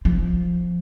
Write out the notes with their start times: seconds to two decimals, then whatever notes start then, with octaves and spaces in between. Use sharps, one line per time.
0.05 F3